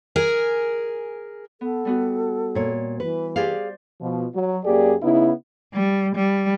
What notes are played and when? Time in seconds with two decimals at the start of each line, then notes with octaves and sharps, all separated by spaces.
0.16 G#4 A#4 G#5
1.61 B3 A4
1.85 G3 B3 F#4
2.55 A#2 C#5
3.00 E3 B4
3.36 G4 G#4 C5 D5 F5
4.01 B2 F3
4.35 F#3
4.65 F#2 A#3 G4 G#4 D5
5.03 C#3 B3 D#4 E4
5.74 G3
6.16 G3